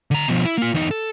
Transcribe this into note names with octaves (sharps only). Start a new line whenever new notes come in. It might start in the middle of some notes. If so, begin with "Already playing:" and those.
D3 A#5
B2 F3
E4
A#3 F4
E2 D#4
A4